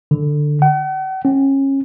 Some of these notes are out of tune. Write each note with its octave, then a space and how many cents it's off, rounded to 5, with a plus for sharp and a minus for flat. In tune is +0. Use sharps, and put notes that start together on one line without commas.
D3 +10
F#5 +45
C#4 -25